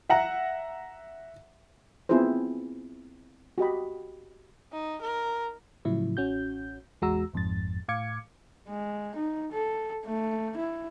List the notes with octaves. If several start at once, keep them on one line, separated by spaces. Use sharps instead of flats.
E5 F#5 A#5
B3 C4 E4 F4 G#4 C5
F#4 G4 D#5 B5
D#4
A#4
A2 C#3 F3 F#3 E4
A1 C#4 F#4 G6
A1 E2 G#3 F#4 A#5 E6
G#1 F2 G#2 A6
A2 F5 D6 G#6 C#7
G#3
D#4
A4
A3
E4